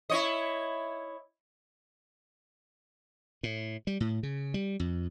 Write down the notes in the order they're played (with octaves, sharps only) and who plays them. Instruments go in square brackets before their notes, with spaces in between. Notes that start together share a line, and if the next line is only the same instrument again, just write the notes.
[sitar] E4 C#5 D#5
[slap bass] A2
G3
A2
C#3
G3
F2